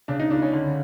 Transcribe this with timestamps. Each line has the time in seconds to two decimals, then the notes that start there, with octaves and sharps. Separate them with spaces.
0.08 C#3 D4
0.19 D#4
0.30 C#2 D4
0.42 C#4
0.53 D3